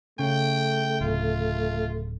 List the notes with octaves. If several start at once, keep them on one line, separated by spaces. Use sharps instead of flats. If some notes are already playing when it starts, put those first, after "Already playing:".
C#3 A3 G5
D1 F4